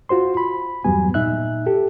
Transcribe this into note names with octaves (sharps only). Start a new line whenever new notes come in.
F4 F#4 C5 C6
B5
E2 G2 F#3 G3 B3 G#5
A#2 D#4 E5 F#6
G4 A4